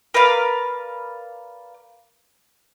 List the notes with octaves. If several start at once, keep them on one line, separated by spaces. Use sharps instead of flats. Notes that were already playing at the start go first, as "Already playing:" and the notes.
A#4 B4 D5 F5